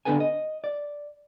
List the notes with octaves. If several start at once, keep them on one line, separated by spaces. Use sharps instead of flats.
D3 B3 D4 A4 B4 G#5
D#5
D5